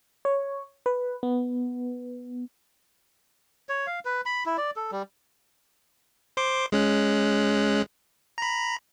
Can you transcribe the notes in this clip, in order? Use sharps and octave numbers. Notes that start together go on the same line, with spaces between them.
C#5
B4
B3
C#5
F5
B4
B5
E4
D5
A4
G3
C5 C6 D6
G#3 C#4 F#6
A#5 B5